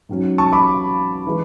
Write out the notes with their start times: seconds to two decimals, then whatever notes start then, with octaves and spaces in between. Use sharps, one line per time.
0.09 G#2 F#3 C#4
0.38 A5 C#6
0.52 B5 D6
1.27 E3 G#3